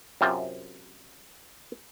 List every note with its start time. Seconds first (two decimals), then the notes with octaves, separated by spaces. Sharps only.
0.21 F#2 C3 C4 F4